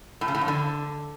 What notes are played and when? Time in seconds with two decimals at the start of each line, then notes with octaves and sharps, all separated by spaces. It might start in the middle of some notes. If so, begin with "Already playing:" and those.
0.21 A2
0.28 C#3
0.35 A2
0.41 F2
0.48 D3